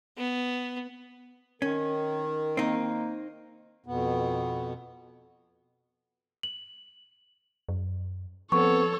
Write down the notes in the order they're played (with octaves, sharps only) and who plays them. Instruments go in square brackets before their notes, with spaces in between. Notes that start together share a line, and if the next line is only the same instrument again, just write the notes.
[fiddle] B3
[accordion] D#3 [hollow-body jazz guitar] C#4 [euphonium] A#4
[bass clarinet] A#3 [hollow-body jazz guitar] C4 D#4
[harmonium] F2 B2 B3
[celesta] F#7
[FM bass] F#2
[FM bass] F3 [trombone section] B3 C4 [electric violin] A4 C#5 [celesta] C#6